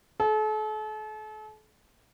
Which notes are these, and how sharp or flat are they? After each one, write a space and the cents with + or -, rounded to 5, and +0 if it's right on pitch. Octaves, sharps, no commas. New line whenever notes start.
A4 -40